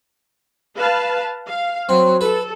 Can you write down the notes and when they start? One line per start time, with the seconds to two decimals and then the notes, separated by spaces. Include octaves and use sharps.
0.76 B4 F5 A5
1.49 F5
1.89 F#3 C4
2.21 A4 B4